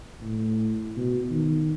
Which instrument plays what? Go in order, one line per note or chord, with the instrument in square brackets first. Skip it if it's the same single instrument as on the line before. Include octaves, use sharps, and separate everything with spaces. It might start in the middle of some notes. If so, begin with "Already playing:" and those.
[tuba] A2
B2
D#3